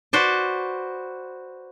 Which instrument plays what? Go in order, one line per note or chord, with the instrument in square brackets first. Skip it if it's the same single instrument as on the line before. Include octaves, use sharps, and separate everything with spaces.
[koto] F#4 B4 C5 D5